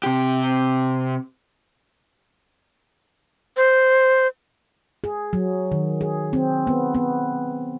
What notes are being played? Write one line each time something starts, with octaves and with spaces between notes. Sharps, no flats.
C3 G4
C5
G#4
F#3
D#3
G#4
C4
B3
B3